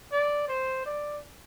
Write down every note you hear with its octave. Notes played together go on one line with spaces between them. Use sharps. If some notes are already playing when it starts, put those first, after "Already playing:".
D5
C5
D5